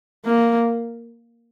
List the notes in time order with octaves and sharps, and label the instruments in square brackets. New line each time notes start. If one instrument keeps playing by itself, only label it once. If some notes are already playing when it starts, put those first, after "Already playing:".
[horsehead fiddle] A#3